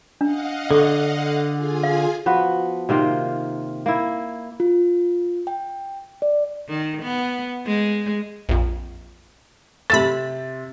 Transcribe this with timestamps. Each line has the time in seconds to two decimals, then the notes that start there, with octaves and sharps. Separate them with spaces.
0.21 D4 D#5 F5 F#5
0.71 D3 A4 C#6
1.51 F4 G#4 G#5
1.83 F5
2.26 F3 B3 F#4 B4
2.89 C3 D#3 A#3 F4
3.86 A#3 E4
4.60 F4
5.47 G5
6.22 D5
6.69 D#3
7.03 B3
7.66 G#3
8.49 A#1 F2
9.90 C3 A4 E5 B5 A6